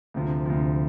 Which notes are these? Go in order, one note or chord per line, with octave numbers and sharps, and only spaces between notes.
D2 C3 F3
D2 C3 F3